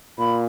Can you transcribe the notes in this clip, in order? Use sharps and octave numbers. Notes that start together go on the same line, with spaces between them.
A#2 B5